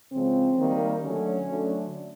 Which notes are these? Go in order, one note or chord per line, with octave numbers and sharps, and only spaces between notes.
C#3 F3 G#3 C4
D#3 G3 A#3
D3 F#3 A3 C#4
D3 F#3 A3